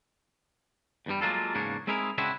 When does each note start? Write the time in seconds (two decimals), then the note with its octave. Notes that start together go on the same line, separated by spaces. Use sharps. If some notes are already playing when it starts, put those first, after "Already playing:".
1.06 E2 G2 G3
1.22 F#3 G#3 A#3 D4 F4 A4
1.54 E2 G#2 C#3 A#3 D4 C#5
1.87 G#3 C4 D#4 E4 G#4 A#4
2.18 C#3 G#3 C4 D4 E4 F#4